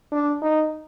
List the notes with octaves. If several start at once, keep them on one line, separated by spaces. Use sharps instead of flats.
D4
D#4